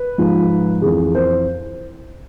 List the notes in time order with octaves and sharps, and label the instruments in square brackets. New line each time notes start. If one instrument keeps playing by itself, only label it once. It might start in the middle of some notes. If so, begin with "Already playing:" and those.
Already playing: [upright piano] B4
G#2 F3
F2 E3 G#4
C5